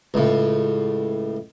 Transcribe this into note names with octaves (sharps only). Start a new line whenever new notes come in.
C#2 A2